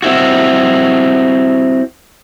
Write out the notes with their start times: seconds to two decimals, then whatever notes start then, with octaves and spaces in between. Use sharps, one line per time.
0.02 C4 E4 F#4